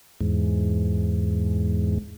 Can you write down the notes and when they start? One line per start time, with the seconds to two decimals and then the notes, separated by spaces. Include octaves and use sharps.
0.21 E2 G#2